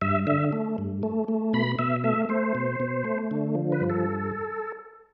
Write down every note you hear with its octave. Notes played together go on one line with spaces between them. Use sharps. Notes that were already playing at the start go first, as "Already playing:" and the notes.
G2 E5
D3 E5
A3
G2
A3
A3
B2 B5
B2 E5
A3 E5
A3 C5
B2
B2
A3
D3
F3
B4
G2
A4